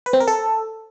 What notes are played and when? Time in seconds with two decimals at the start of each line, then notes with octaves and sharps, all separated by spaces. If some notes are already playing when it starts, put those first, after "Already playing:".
0.06 B4
0.13 C4
0.20 A#4
0.28 A4